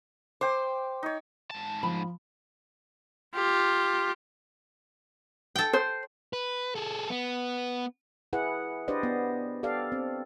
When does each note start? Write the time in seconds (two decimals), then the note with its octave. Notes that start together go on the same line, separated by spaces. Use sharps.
0.41 C5 G5 D6
1.03 D#4 C#5
1.51 G#2 A5
1.83 F3 B5
3.35 F4 G4
5.56 A4 G5
5.73 C5
6.33 B4
6.75 G#4 A4
7.10 B3
8.33 E4 G#4 B4 F#5
8.88 D4 G4 B4 C5 D5 D#5
9.03 B3
9.63 G4 A4 D5 F5
9.92 C4